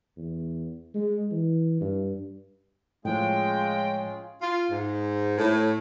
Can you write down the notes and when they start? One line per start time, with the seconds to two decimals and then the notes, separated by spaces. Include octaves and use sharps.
0.17 E2
0.94 G#3
1.31 E3
1.80 G2
3.05 A2 F3 G#3 C#4 F4 G#4 G5
4.41 F4
4.70 G#2
5.37 A2